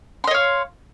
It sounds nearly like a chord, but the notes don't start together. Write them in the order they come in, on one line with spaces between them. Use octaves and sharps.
C6 D#5 C#5 F5